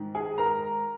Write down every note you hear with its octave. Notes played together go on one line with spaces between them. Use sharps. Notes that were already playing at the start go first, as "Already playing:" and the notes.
Already playing: G#2 D#3
G#4 G#5
A#4 A#5